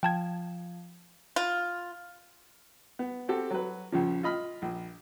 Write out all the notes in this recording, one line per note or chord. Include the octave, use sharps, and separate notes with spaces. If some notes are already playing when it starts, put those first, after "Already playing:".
F3 G5 A5 G#6
F4
B3
C4 F#4 G4 A4
F#3 B4
A#1 C#3 F3
F4 D#5 B5 F6
A#1